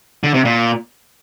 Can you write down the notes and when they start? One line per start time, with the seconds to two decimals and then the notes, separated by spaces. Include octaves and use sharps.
0.24 D3
0.34 C3
0.45 A#2